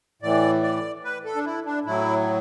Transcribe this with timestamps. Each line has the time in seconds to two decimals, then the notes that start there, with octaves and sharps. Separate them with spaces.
0.22 A2 E3 D5
0.63 D5
1.04 B4
1.25 A4
1.36 D4
1.45 E4
1.65 D4
1.85 A2 F#3 E4